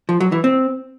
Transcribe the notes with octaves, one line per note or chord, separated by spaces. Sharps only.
F3
F#3
E3
C4